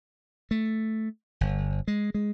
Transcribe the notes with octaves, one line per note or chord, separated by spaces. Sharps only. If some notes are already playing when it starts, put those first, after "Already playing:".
A3
G1
G#3
G#3